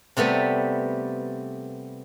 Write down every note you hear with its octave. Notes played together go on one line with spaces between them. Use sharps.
C3 G3 A3 B3